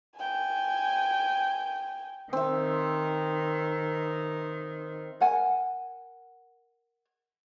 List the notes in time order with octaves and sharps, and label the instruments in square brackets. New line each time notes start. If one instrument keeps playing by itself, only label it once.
[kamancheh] G5 G#5
[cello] D#3 [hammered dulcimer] C4 E5
[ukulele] A#4 F#5 G#5